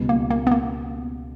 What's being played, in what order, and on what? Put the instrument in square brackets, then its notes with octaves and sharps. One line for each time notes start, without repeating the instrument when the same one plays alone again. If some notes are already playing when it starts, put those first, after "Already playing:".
Already playing: [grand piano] C#2 B2 G3
[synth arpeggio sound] A#3
A#3
B3
A#3